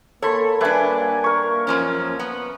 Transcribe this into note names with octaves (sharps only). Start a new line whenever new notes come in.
A#3 A4 C#5 B5 C6
G3 D4 B4 E5 G#5
A#4 C#6
F#2 F3 C#4
B3